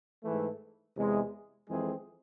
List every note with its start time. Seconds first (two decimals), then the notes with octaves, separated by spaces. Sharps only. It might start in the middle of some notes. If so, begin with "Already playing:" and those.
0.23 G#2 E3 A3
0.96 E2 C3 G#3
1.68 F2 E3 G#3 C4 G#4